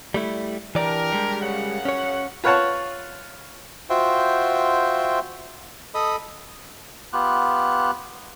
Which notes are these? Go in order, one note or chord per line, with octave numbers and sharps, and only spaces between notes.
G3 A3 E4
E3 D4 G4 A#4 D5
G3 G#3
F#2 C#3 F#5
C#4 C#5
F4 B4 C#5 F#5 A5 C#6
F4 F#4 C5 E5 G5
A4 D#5 B5 D#6
B3 F4 G4 F#6